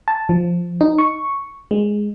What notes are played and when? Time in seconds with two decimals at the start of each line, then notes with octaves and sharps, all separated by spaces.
0.08 A5
0.29 F3
0.81 D#4
0.98 C#6
1.71 G#3